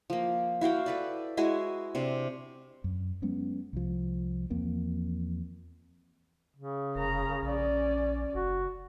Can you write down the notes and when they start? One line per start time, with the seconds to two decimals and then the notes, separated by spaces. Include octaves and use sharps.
0.10 F3 A#3
0.61 E4 F#4 F5 G5
0.86 A4 B4 D5
1.37 G#3 E4 F#4 G#5
1.95 C3 C4 D4
2.84 F#2
3.22 F#3 G#3 B3 C#4
3.73 C2 F3
4.50 E2 F3 A#3 C4
6.57 C#3
6.95 F1 A#4 A#5
7.42 A#1 C#4 D5
8.34 F#1 F#4